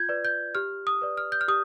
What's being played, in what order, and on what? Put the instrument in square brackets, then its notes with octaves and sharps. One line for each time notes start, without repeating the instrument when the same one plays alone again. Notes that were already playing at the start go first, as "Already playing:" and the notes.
Already playing: [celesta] F4 G6 G#6
B4 D5
G6
G4 F6
D#6
B4 D5
F6
G6
F6
G4 D#6